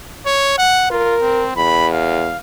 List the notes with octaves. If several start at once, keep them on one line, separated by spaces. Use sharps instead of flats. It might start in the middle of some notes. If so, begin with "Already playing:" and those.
C#5
F#5
F4 A#4
C4
E2 B5
F5